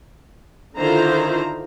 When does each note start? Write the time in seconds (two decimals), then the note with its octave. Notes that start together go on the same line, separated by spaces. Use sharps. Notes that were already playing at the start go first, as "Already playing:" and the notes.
0.78 D3 D#3 E4 F4 C5 A#5